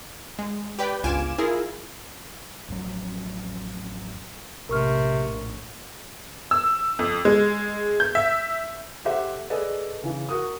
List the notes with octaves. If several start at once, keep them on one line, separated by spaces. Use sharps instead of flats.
G#3
G4 B4 D5 G5
G1 C#2 F4 G#5 D6 E7
E4 F4 G#4 A#4
A1 F2 F#3
A#1 A2 C3 A#4 C#6 F6
E6
F2
G#3
G6
E5
G4 A4 C5 E5 F#5
G#4 A4 B4 D5 D#5
C#3 E3
F#4 A#4 D#6